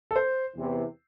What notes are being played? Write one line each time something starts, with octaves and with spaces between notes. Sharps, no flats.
A4
C5
E2 C3 E3